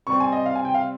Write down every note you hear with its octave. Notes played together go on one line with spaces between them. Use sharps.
C3 G3 C4 C#6
G#5
D#5
F5
G#5
G5
F5